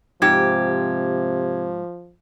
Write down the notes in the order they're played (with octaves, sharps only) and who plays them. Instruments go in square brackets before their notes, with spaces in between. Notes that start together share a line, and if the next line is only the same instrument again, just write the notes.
[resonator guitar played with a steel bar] G#2 G4 [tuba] C3 [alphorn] F3 [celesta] G#6